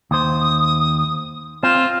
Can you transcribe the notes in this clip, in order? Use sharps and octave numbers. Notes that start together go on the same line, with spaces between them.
D#2 C5 D#6
C4 F4 E7